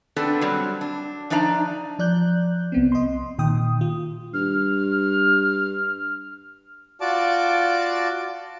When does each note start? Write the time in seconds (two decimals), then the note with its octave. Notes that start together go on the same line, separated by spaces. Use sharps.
0.16 B3 C4 D4 A4 B4 D5
0.41 F#3 G3 C4
0.81 D4
1.30 F3 D4 D#4 D5 E5 A#5
1.99 F3 D5 F#6 G6
2.72 C2 B3 C4
2.92 D#5 C6
3.38 A#2 D#3 G5 D#6
3.81 F4
4.33 G2 F6
7.01 F4 F#4 D5 A5 D6